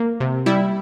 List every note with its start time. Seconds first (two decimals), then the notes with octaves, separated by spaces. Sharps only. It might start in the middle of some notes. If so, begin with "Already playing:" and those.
Already playing: A#3
0.20 C3
0.46 G3 E4